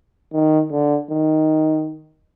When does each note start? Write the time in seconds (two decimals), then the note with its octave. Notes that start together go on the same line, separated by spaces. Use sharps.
0.33 D#3
0.71 D3
1.11 D#3